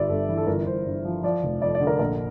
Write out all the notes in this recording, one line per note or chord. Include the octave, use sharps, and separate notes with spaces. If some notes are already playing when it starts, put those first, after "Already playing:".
Already playing: G1 G3 D5 E5
G2 A4
E3
A4
G1 A#4
G1 C5
G2
F3
F3 D5
F1
F2 D5
D5
D3
A#4
A#1 A#4